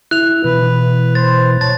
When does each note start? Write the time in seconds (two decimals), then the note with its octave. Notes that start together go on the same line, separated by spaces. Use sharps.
0.11 E4 F#6 F7
0.44 B2 E3 B4
1.15 C5 A6
1.61 C#5 A5 A6